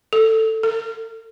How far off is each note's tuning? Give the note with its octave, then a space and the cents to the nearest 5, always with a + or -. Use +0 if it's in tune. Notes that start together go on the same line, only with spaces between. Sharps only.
A4 +10
A4 +40